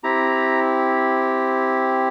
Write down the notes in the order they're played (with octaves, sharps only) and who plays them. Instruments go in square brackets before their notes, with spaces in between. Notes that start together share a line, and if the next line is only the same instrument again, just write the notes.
[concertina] C4 E4 G4 A#5